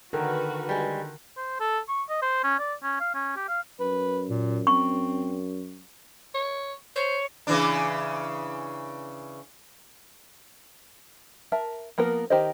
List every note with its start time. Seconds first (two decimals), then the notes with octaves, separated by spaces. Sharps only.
0.13 D3 D#3 F#4 A#4 B4
0.69 G3 G#3
1.37 C5
1.60 A4
1.89 C#6
2.09 D#5
2.22 C5
2.43 C#4
2.59 D5
2.83 C#4
3.00 F5
3.14 C#4
3.36 G4
3.48 F5
3.80 F#2 B4
4.30 A#2
4.67 C4 C#6
6.35 C#5
6.96 C5 C#5
7.47 C#3 E3 D4
11.52 A#4 E5 A5
11.98 F3 A#3 B3 A#4
12.30 D#3 G4 C5 D#5